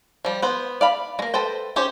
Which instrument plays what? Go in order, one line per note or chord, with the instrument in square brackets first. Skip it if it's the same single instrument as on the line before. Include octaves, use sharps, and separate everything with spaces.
[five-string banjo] F3 G3
B3 C5
D5 F5 B5
G#3 A#3
A4 B4 C5 G5
C#4 G4 C5